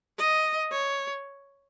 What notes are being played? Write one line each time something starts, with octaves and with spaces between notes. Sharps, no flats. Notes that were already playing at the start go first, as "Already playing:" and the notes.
D#5
C#5